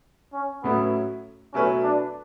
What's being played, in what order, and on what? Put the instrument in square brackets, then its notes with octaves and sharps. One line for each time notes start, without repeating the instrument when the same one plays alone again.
[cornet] C#4
[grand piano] A2 F#3 A3 C#4 E4 [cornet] B3
[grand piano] B2 F#3 A3 E4 B4 [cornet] C#4
[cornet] D4